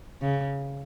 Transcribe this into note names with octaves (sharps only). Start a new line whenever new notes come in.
C#3